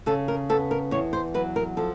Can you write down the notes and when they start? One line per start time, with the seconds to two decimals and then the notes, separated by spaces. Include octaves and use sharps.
0.06 C#3 A4
0.28 A#4
0.49 B3 A4
0.71 A#4
0.91 E2 C#5
1.13 C5
1.34 F#3 B4
1.56 A#4
1.77 F3 A4